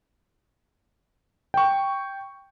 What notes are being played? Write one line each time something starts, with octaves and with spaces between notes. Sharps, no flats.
G5 C#6